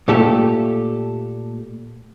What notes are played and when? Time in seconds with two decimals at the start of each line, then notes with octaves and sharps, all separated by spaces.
0.08 A#2 A3 G4 A4